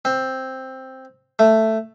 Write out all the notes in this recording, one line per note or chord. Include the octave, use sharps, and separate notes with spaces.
C4
A3